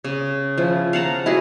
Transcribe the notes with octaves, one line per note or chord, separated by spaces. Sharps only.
C#3
F3 E4
F5 F#5 A5 A#5
E4 F#4 G#4